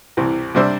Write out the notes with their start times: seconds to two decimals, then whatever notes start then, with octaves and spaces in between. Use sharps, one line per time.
0.17 C2 C3 E3
0.55 C3 G3 D4 C5 E5